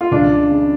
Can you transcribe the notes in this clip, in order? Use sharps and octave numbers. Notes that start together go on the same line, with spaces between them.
F4
C#2 D4
C#3